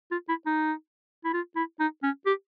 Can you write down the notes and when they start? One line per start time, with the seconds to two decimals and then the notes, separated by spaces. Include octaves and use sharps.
0.11 F4
0.29 E4
0.46 D#4
1.25 E4
1.33 F4
1.56 E4
1.80 D#4
2.03 C#4
2.26 G4